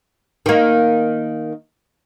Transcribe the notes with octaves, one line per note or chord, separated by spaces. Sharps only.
D#3 A#3